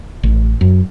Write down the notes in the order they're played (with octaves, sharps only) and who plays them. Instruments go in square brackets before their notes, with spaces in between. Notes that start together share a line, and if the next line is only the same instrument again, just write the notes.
[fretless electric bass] A1
F#2